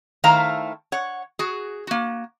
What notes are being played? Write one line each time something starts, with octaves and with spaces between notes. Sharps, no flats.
D#3 A3 E4 C5 F5 A#5
C#5 F#5
F#4 G#4
A#3 F#4